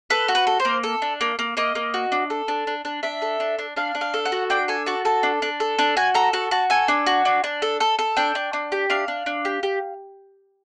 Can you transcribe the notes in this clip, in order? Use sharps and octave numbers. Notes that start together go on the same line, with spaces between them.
A4 B4
F#4
B4
A4
C5
A#3
A4
D4
A#3
A#3
A#3 D#5
A#3
F#4
D4
A4
D4
D4
D4
D4 E5
A4
D4
D4
D4 F5
D4
F5
A4
F#5
F#4
D4 G5
A4 G#5
F#4 A5
A4 A5
D4
D4
A4
D4
F#4 G#5
A4 A#5
F#4 A5
F#4 A5
A4 G#5
D4
F#4
D4
D4
A4
A4
A4
D4 G5
D4
D4
G4
D4 F5
D4
D4
G4
G4